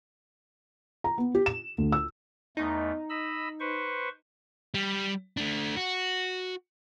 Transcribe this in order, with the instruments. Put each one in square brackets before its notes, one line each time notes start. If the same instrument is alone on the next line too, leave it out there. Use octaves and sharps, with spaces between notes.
[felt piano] A#5
B3
G4
E7
D2
E6
[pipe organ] E2 A3 [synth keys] D#4
[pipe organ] D#5 B5 E6
B4 C5 C#6
[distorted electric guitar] G3
A3 D4
F#4